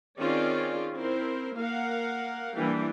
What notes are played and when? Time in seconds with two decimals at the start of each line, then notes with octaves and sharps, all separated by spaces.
0.20 D#3 C4 C#4 F4 G#4 D5
0.94 C4 E4 A#4 C5
1.55 A#3 A#4 F5 F#5
2.57 E3 G3 A#3 D4 G5